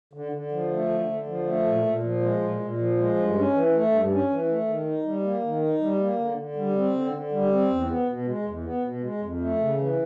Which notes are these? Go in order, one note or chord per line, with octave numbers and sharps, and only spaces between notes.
D3
D3
F3
A3
D3
D3
F3
A3
A#2
A#2
F3
G#3
A#2
A#2
F3
G#3
G2
C#4
E3
A3
G2
C#4
E3
A3
D#3
D#4
G3
A#3
D#3
D#4
G3
A#3
D3
D3
G3
C4
D3
D3
G3
C4
E2
B3
B2
G#3
E2
B3
B2
G#3
F2
A3
C#3
E3